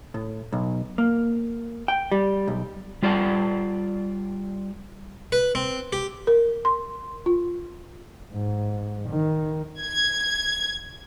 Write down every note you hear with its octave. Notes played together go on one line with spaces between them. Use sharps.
A2
B1
A#3
G5
G3
B1
G3 F4 D5 F#5 A5
B4
C4
G4
A#4
C6
F4
G#2
D#3
G#6